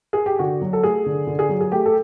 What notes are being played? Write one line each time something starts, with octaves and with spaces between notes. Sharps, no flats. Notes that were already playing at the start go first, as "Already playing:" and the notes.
G#4
G4
D3 F#4
F#3
A4
A3 G#4
D3
D3
G#4
F#3
G#4
A3 G4
A4